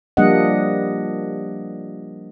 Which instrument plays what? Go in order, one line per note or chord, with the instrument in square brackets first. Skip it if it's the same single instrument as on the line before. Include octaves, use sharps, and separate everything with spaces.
[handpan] F3 G3 A#3 D4 D#5 F#5